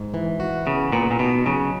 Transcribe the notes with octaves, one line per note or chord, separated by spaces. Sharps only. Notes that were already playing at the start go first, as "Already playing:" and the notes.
Already playing: G#2
E3
F#4
C#3 B3
A#2 B3
A#2
B2 D#4
C#3 F#3